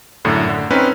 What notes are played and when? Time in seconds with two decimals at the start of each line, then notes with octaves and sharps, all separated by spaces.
0.25 F#2 A2 D3
0.49 D3
0.71 C4 C#4 D#4 B4